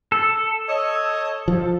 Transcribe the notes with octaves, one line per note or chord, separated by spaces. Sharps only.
A4
C#5 D#5
F3